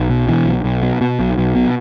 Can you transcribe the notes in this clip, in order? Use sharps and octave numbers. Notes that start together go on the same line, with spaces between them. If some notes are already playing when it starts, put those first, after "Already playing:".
Already playing: B1
B2
B2 E3
B1
B1
B2
B2
B1
B1
B2